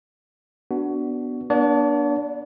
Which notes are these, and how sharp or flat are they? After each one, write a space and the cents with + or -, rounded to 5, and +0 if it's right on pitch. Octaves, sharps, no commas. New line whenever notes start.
B3 +0 D4 -5 F#4 +15
B3 -45 D4 +0 D5 -45